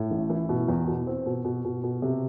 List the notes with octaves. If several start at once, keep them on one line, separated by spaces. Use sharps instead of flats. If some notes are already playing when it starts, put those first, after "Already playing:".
Already playing: A2
A1
E3
B2
E2
B2
C4
B2
B2
B2
B2
C3